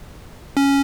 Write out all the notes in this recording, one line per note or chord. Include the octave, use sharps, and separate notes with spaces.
C#4